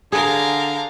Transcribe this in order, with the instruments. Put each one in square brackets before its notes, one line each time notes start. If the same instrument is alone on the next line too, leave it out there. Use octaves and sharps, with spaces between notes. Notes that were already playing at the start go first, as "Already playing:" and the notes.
[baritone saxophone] D3 [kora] G#4 [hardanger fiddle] A#4 F5